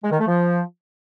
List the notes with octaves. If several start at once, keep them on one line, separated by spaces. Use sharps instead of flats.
G#3
D#3
A3
F3